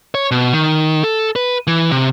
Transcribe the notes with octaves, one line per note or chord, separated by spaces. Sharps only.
C#5
B2
D#3
A4
B4
E3
C3